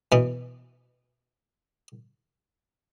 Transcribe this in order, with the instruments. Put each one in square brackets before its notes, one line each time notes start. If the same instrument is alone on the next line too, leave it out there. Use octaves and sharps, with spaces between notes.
[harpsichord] B2 E3